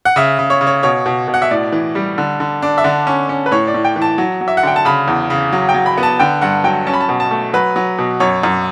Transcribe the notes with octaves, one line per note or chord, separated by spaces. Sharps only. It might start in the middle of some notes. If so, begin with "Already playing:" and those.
F#5
C#3 E5
C#3
C#5
C#3
C#5
B2 C#5
B2
B2
F#5
E5
A2 D5
E3
G3
D3
D3
D4
E5
D3 D5
C#4
C#4
B4
A2 C#5
D5
A2
G5
E3
A5
F#3
F#3
E5
F#5
D3 G5
A5
C#3 B5
E2
C#3
F#3
G5
F#3
B5
B3
A5
D3 G5
G2 F#5
F#3 G5
C#4 A5
B5
A5
B2
A5
A3
F#3 B4
F#3
B2
F#2 C#5
F#2